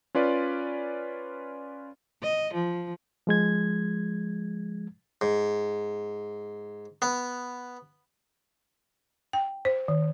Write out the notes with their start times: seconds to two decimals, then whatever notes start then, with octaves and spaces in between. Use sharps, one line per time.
0.15 C#4 F4 B4 D5
2.23 D#5
2.54 F3
3.27 F3 G#3 G#6
5.21 G#2
7.02 B3
9.33 G5
9.65 C5
9.88 D#3